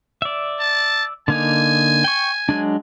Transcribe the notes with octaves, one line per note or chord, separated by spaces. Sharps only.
D5 E5
A5
D3 A#3 D#4 G#5
G5 C#6
F#3 G#3 D4